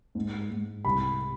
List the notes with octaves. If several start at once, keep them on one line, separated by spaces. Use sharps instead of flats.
G#2
G#2
C2 B5